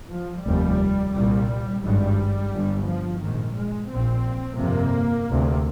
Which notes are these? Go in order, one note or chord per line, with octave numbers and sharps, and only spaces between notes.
F3
F1 D#2 G3
C2 A#2 G3
G#1 G2 G3
G1 G2
F3
A#1 G#2 D#3
G#3
A#1 A#2 C4
G1 F2 C3 A#3
D2 C3